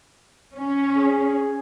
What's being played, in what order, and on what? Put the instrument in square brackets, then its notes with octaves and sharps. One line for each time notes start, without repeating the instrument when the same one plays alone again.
[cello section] C#4
[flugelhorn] G#4